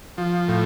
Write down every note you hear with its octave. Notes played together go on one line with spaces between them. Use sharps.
F3
A2